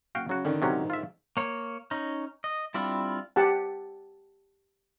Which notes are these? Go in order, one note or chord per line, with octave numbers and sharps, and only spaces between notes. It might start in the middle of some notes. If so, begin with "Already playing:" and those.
F#1 F#4 F5 G5
C#3 F#3 F#4
D3 D#3 C#4
G#2 C3 F#3 C#4
F4 E5
A#3 C#5
C#4 D#4
D#5
G3 C4 D4 E4 F4
G4 F#5 A5